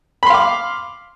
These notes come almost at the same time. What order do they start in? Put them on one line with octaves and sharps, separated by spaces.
B5 C6 F5 D6